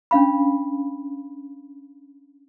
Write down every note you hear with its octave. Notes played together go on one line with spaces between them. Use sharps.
C#4 D4 F5 B5